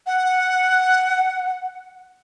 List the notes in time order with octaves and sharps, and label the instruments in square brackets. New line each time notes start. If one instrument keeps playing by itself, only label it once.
[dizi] F#5